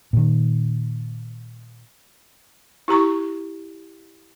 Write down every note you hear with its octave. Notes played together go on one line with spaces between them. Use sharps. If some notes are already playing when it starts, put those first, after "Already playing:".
A#2 D#3
E4 G4 A#5 C#6